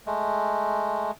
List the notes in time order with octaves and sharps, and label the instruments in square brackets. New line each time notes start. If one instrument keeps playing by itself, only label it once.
[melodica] G#3 A3